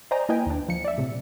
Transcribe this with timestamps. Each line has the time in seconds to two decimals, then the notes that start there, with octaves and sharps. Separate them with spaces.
0.11 C5 D5 D#5 G5 G#5 A#5
0.29 A#3 E4 B4 D#5 G5 G#5
0.46 D#2 D4
0.69 F3 C#7
0.85 D5 E5
0.98 A2 C3